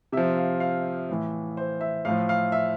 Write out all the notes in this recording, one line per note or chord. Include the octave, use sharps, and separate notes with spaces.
C3 F3 E5
F5
F5
A2 E3
C5
E5
A2 F3 F5
F5
E5